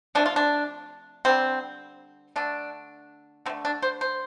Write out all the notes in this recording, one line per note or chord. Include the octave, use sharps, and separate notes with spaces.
C3 F3 A3 D4
F4
D4
D3 G3 C4
D3 A3 D4
D3 A3 C4
D4
C5
C5